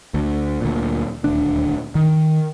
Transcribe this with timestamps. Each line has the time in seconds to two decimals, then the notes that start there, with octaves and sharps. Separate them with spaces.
0.14 D2
0.61 D2 A#2
1.24 D#1 D2 D4
1.95 D#3